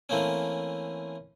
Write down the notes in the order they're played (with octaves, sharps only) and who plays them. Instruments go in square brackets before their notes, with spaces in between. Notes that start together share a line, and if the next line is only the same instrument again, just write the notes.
[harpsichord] E3 A3 A#3 C4 C#4